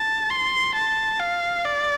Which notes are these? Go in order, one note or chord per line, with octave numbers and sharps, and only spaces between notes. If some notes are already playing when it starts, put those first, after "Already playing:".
Already playing: A5
C6
A5
F5
D5